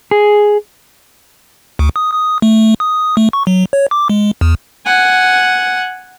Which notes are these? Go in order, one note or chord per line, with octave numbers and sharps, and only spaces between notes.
G#4
D2
D#6
D#6
A3
D#6
A3
C#6
F#3
C#5
D6
G#3
E2
F#5 G#5